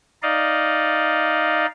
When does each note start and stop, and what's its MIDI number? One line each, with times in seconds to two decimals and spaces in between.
0.23 1.66 63
0.23 1.66 74
0.23 1.66 75
0.23 1.66 77